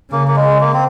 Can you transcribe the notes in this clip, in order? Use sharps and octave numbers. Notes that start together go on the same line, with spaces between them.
C#3 A#3
A#3
G#3
A#3
C4